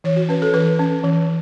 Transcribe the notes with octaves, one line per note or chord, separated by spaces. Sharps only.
E3 C#5
F#4
C#4 B4
A4
E3 B4
C#4
E3